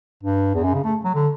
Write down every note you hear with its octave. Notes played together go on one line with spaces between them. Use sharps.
G2
E2
F#2
C#3
A3
F#3
D3